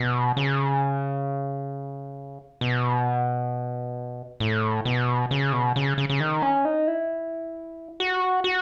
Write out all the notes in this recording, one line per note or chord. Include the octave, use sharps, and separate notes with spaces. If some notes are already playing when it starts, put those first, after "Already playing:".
Already playing: B2
C#3
B2
A2
B2
C#3
B2
C#3
C#3
C#3
D#3
C#4
D#4
E4
F#4
F#4